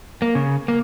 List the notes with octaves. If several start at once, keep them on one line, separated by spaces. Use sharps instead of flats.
A#3
C#3
A#3